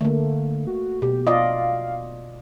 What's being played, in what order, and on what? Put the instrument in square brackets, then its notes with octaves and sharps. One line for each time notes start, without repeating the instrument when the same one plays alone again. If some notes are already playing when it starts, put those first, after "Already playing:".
[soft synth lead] D3 [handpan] A3 A#3
[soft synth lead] F#4
[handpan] B2 [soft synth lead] G4
[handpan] F4 D5 D#5 [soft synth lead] F5